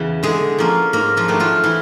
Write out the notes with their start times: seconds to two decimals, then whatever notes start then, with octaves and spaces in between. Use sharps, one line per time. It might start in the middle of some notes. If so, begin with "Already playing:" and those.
Already playing: E2 C#3 E3 B3
0.23 D3 G#3 G#4
0.58 F3 A#3 C#4
0.93 G#2 A#3 A#4
1.17 F3 F4
1.28 D#3 F#3 A3 D4
1.40 F3 F4
1.64 E3 E4